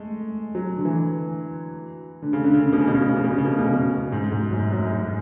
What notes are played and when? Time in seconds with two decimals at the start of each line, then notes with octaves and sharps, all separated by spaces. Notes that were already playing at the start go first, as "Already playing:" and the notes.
Already playing: G#3 A3
0.55 F#3
0.76 D3
0.85 E3
2.22 D3
2.33 C#3
2.44 D3
2.54 C#3
2.73 B2
2.81 C#3
2.88 B2
2.95 C#3
3.02 B2
3.09 C#3
3.16 B2
3.24 C#3
3.31 B2
3.38 C#3
3.45 B2
3.52 C#3
3.59 B2
3.67 C#3
3.74 B2
4.12 G#2
4.32 G#2
4.52 F#2
4.72 F#2
4.92 G#2